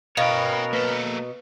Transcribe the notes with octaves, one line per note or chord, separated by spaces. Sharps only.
B2 B3 C#4 A#4 C#5 F5 G5
A#3 A4 B4